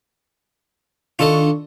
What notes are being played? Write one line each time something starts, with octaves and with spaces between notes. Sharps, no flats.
D#3 D4 F4 A4 D#5 C#6